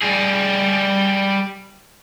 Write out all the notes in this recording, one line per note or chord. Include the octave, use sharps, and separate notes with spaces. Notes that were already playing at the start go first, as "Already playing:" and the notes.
G3 G#4